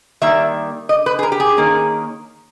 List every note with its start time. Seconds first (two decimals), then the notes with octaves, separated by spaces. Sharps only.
0.22 D#3 G3 A#3 E5
0.89 D#5
1.06 B4
1.19 G#4
1.23 A#4
1.32 G4
1.40 G#4
1.57 D#3 A#3 C#4